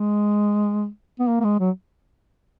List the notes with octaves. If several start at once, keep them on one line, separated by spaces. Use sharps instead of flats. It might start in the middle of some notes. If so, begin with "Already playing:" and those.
Already playing: G#3
B3
A#3
A#3
G#3
F#3